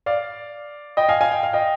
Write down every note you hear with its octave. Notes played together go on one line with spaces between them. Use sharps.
D5 F5
D#5 G5
F5 G#5
F5 G#5
G5
F5
D#5 G5